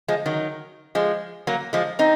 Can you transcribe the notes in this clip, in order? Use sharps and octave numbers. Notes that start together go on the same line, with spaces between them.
F3 G#3
D#3 F#3
F3 G#3
F#3 A#3
F3 G#3
C4 D#4